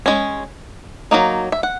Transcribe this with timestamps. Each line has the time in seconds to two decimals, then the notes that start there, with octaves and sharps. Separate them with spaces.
0.06 G#3 C#4
1.11 F#3 A#3 D#4
1.52 E5
1.63 F#5